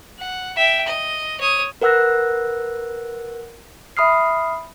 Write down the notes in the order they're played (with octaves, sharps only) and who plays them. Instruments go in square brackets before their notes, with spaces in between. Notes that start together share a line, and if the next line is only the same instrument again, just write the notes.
[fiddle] F#5
E5 G5
D#5
C#5 D#6
[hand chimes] A#4 B4 F#5 E6 F#6 A#6
E5 B5 D#6 F6 C7